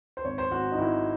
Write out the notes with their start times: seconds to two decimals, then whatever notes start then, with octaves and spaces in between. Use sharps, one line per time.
0.17 C5
0.25 G#1 C#5
0.38 C5
0.51 G#1 F#4
0.72 D#4
0.78 G#1 E4